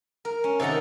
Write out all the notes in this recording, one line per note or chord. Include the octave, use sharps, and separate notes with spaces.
A#4
C#4
C3 D#3 A4 F#5 A#5